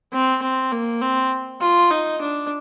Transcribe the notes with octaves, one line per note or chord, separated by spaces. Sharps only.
C4
C4
A#3
C4
F4
D#4
D4